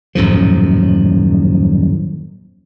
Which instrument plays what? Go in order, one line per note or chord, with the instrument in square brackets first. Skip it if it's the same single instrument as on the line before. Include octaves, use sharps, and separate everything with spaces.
[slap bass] D#1 F#2 A2 F3